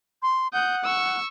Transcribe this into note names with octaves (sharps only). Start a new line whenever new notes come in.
C6
F#5 D#6 G6
C#6 E6